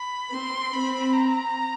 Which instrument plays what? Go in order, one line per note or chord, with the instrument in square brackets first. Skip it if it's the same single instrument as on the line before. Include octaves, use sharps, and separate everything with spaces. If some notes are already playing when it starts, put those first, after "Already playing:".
Already playing: [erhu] B5
[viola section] C4 [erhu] C6
[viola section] C4 [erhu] B5
[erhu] A#5